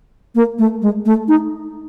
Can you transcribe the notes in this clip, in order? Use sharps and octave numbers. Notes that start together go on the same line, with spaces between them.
A#3
A3
G#3
A3
D#4